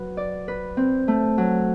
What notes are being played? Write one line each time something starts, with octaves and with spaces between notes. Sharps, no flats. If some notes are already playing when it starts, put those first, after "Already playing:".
Already playing: F#3 B4
D5
B4
C4
A3
F#3